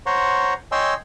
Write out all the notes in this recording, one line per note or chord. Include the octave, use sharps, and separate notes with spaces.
C5 C#5 F#5 A#5 C6 C#6
C#5 D#5 G5 G#5 C6 E6